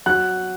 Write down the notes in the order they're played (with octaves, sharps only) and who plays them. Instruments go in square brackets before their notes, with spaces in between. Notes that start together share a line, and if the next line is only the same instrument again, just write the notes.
[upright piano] F#3 F#5 F#6